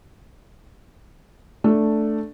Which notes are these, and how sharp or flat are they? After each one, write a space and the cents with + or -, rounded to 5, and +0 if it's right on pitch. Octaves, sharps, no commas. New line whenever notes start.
A3 +0 D4 +0